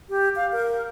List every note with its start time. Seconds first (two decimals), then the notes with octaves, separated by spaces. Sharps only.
0.09 G4
0.36 F5
0.52 A#4